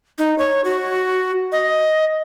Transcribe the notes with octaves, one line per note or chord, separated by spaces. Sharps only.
D#4
C#5
F#4
D#5